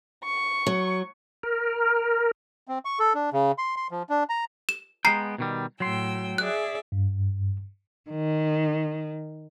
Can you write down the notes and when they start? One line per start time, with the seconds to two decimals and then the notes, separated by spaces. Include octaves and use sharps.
0.24 C#6
0.67 F#3
1.43 A#4
2.68 C4
2.85 C#6
2.99 A4
3.14 D4
3.33 C#3
3.58 C6
3.76 C6
3.91 F3
4.09 D4
4.29 A#5
4.69 E7
5.05 G#3 B3 G5 A#5 C7
5.38 B2 D#3 G3
5.80 A2 F#3 G5 C6 E6
6.38 G#4 D5 E5 F#6
6.92 G2
8.10 D#3